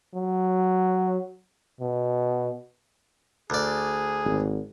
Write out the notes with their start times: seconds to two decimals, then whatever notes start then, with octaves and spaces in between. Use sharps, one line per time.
0.15 F#3
1.81 B2
3.50 D2 G#4 D5
4.25 G#1